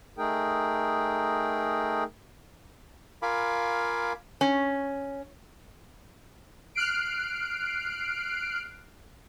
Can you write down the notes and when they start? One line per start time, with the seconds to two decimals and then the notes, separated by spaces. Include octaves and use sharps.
0.18 A3 D#4 G#4 A#4 G5
3.22 F4 A#4 F5 G#5 B5 D6
4.41 C#4
6.75 F6 F#6 C7 D7